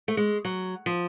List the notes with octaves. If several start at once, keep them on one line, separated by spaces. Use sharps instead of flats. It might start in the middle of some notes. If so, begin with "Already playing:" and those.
A3
G#3
F#3
F3